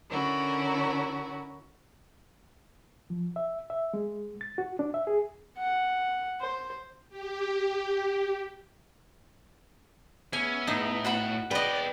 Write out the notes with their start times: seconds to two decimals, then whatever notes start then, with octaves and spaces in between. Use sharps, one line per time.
0.11 D3 C#4 E4 F#4 A#4
3.10 F3
3.36 E5
3.70 E5
3.94 G#3
4.41 A6
4.58 F#4
4.79 D4
4.94 E5
5.07 G#4
5.58 F#5
6.41 C5
7.09 G4
10.33 B3 C#4 E5 G#5
10.67 A2 D#4
11.05 F#4 F#5 B5
11.51 B3 B4 D5 D#5 G5